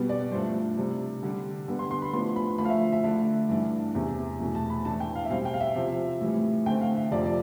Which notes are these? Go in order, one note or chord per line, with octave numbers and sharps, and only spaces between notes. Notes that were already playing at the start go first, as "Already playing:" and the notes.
Already playing: B2 G3 B3
D5
G2 F3 A3 D4 C5
C3 G3 D4
D3 G3 D4
D3 G3 B3 D4
C6
C6
B5
A2 F3 B3 D4 C6
B5
D3 F3 A3 B5
F5
E5
E5
D3 A3 D4
G2 E3 A3 D4
E2 C3 E3
E2 B2 A3
A5
B5
A2 E3 A3 D4 A5
G5
F5
E5
B2 G3 C4 F5
G5
F5
E5
C3 F3 C4
A2 E3 G3
D3 A3 C4 G5
F5
E5
F2 C3 F3 D5
D5